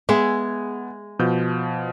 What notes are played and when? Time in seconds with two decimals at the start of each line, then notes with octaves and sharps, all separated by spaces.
0.09 G#3 B3 G#4 E5
1.19 B2 F3 G6